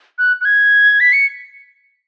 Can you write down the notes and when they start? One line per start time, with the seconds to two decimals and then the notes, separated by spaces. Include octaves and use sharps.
0.18 F#6
0.41 F#6
0.45 G#6
1.00 B6
1.13 C#7